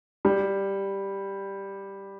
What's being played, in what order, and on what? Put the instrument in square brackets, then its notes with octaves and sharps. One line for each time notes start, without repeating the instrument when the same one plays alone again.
[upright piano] G3